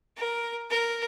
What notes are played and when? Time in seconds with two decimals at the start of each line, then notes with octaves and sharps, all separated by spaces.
0.17 A#4
0.70 A#4